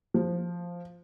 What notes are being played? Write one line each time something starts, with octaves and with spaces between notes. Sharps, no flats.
F3